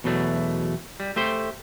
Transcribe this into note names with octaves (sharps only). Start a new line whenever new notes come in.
E2 B2 F#3 A3
G3
A3 G4 C5